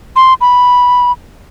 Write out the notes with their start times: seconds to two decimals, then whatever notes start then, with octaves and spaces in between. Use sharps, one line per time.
0.16 C6
0.41 B5